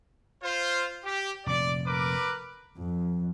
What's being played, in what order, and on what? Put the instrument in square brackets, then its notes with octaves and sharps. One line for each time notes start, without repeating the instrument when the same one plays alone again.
[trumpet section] F4 C5
G4
[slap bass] F1 A#2 [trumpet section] D5
[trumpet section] A#4 B4 D6
[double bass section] F2